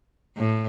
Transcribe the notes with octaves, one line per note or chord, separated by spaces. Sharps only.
A2